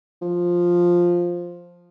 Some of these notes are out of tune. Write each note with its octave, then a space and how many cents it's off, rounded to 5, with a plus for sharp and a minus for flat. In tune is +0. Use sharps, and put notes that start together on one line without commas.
F3 +5